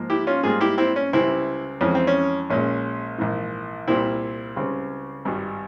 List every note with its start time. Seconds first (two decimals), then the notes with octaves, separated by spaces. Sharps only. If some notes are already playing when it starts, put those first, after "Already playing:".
Already playing: G#2 F3 A#3
0.10 E4 G4
0.27 C#4 F4
0.43 G#2 G3 A#3 F4 G#4
0.61 E4 G4
0.78 C4 E4
0.96 C#4
1.13 C#2 C3 G3 C4 E4
1.81 F2 E3 G#3 C4 C#4
1.95 C4
2.07 C#4
2.50 A#1 A#2 G#3 C#4
3.18 A#1 G#2 E3
3.88 C2 A#2 G3 C4 E4
4.56 C#2 C#3 G3 C4
5.25 G#1 G2 G3